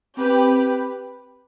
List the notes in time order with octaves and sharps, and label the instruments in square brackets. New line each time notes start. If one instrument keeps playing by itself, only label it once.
[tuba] C4 [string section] G4 B4